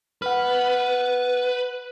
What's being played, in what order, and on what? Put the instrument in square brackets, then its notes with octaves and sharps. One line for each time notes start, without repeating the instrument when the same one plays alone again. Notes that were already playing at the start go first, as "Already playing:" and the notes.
[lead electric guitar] B4 [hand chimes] F#5 F6